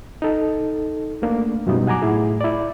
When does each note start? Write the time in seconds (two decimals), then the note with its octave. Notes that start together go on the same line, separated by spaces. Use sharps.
0.22 D#4 A4
1.22 A3 A#3 D4
1.67 F#2 B2 F#3 G3 D#4 D#5
1.87 F#5 G#5 A#5 D6
2.02 A2 E4 G#4
2.41 E4 D5